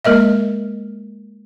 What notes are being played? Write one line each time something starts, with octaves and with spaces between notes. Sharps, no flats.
G#3 A#3 A#4 D#5 E5